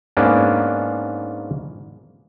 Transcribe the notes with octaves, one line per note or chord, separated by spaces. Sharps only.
G#2 A#3 B3 C#4 D4